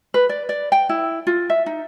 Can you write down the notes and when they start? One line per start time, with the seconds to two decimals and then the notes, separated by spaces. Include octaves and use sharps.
0.14 B4
0.29 D5
0.49 D5
0.72 G5
0.89 E4
1.27 F4
1.50 E5
1.66 D#4